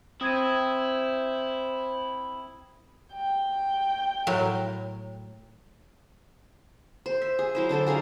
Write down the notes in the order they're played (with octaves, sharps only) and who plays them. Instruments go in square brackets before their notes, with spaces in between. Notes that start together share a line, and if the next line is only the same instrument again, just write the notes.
[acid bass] C4 [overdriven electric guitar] E4 [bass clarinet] C5 [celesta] D#6 G#6 D#7
[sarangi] G5
[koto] A2 F#3 A#4
[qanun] C5
E5
G#4
F#3 E4 C5
D3 D4 A4 C5
F#4 G#4 A#4 F5